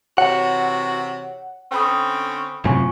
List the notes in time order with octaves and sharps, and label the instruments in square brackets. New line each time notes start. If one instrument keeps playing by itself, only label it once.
[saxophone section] C3 E3 F#4 [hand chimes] C#5 [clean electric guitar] F#5
[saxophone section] D3 C4 C#4 [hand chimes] G5 B5 D#6
[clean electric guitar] F#2 A2 C3 [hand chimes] F4 G#5 C#6